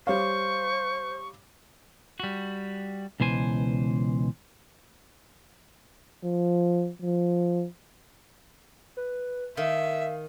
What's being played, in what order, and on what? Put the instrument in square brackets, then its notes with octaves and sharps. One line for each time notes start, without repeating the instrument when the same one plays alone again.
[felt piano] G3 C#5 F5 [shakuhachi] C5 [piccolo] C#6
[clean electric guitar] G3 F#4
C#2 B2 E3 C5 G#5
[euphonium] F3
F3
[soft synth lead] B4
[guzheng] D#3 [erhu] E5 [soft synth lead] F5